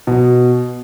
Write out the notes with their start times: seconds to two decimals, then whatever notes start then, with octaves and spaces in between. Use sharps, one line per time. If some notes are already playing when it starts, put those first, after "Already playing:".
0.07 B2